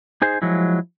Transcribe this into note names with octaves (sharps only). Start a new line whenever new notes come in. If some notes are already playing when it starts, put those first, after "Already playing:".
D#4 G#4 C5
F3 F#3 G#3 E4